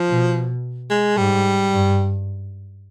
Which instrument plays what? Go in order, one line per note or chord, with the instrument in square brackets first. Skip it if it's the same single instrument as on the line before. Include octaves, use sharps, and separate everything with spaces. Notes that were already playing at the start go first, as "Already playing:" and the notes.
Already playing: [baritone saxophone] F3
[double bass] B2
[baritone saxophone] G#3
[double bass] G#2 [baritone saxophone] G3
[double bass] G2